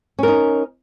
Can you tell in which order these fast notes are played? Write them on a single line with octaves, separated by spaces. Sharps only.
C#4 A#4 D#4